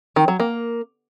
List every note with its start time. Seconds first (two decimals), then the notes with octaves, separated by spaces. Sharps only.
0.16 D#3
0.28 F#3
0.40 A#3